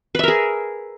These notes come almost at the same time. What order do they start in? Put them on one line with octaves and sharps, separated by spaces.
B4 E5 A#4 G#4